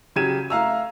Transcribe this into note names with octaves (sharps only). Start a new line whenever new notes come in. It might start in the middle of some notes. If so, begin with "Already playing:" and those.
C#3 F#3 G4 G#6 D#7 E7
A3 F5 A#5 E6